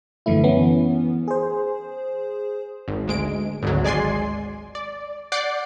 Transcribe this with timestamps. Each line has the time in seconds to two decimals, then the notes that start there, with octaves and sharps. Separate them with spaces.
0.26 F#2 D3 E3 A3 E4
0.43 E3 B3 C#4
1.28 G#4 C5
2.88 G#1
3.08 D2 G#3 D7
3.63 G#1 D2 F#3
3.84 G#3 D5 G#5 C6 C7
4.75 D5
5.32 D5 F#5 D6 G6 C7